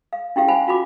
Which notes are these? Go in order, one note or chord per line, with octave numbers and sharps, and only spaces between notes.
F5
C#4 E4 G4 F5
C5 F5 F#5 G#5 B5
F4 F#4 B5 D6